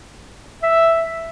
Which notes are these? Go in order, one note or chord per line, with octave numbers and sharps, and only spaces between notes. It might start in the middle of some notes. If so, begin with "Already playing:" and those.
E5